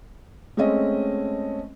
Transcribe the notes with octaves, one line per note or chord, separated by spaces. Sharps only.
G#3 A3 C4 C#4 D#5